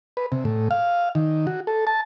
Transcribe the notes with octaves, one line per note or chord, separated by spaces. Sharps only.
B4
C3
A2
F5
D#3
F#4
A4
A5